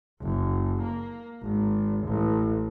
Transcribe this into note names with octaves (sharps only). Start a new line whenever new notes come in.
F#1
A#3
G#1
A1